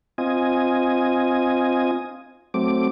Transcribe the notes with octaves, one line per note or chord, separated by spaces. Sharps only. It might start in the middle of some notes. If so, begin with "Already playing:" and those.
C4 F4 D#5 G#5
F#3 A3 C4 D6